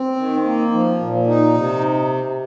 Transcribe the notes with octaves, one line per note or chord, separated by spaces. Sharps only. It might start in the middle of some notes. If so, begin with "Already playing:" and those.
Already playing: C4
D#3
A#3
F3
A#2
D#4
C3